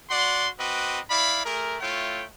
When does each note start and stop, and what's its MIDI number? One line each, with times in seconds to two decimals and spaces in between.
0.10 0.49 66
0.10 0.49 74
0.10 0.49 78
0.10 0.49 84
0.59 1.00 60
0.59 1.00 66
0.59 1.00 71
0.59 1.00 75
0.59 1.00 86
1.11 1.42 64
1.11 1.42 74
1.11 1.42 77
1.11 1.42 83
1.46 1.80 57
1.46 1.80 68
1.46 1.80 70
1.81 2.25 57
1.81 2.25 64
1.81 2.25 65
1.81 2.25 73
1.81 2.25 79